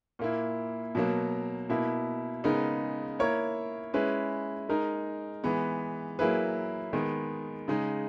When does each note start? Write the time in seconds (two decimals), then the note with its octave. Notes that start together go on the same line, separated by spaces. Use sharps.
0.19 A#2 A#3 E4
0.95 B2 F#3 A#3
1.70 B2 A#3 E4
2.44 C#3 G#3 B3 D#4 A#4
3.19 A#3 E4 A#4 C#5
3.94 G#3 C#4 E4 B4
4.69 G#3 D#4 A#4
5.44 E3 G#3 B3
6.19 F#3 A#3 E4 G#4 B4
6.93 D#3 G#3 B3
7.68 C#3 G#3 D#4